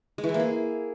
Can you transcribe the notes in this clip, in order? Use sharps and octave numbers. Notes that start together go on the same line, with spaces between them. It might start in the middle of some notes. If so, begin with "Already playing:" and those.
G#3
E3
E4
A#3
G#4